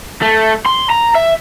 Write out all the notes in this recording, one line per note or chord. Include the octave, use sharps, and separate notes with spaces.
A3
C6
A#5
E5